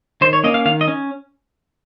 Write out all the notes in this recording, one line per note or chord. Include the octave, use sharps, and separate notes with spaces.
D#3 C5
C#5
A#3 C#4 D#5
F5
D#3 F5
D#5
C#4